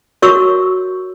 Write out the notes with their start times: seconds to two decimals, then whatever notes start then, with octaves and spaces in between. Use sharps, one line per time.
0.22 F#4 A#4 C#5 C#6 E6